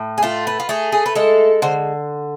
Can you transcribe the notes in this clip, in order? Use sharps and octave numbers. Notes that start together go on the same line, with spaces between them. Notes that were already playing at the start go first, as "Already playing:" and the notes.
Already playing: A2
G#4
A3 F4
B4
F4
A3 G#4
G#4
B4
G#3 A4
D3 C5